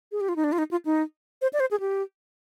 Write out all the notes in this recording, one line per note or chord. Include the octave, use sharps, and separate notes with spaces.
G#4
G4
F4
D#4
D4
F4
D#4
F4
D#4
C5
D5
C5
G#4
G4